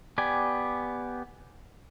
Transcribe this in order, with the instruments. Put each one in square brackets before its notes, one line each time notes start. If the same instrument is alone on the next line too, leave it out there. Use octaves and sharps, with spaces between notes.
[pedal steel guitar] B3 G4 D5 G#5